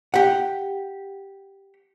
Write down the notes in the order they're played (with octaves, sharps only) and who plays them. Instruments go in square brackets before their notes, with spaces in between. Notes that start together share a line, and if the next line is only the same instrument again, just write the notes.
[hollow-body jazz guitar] G4 F#5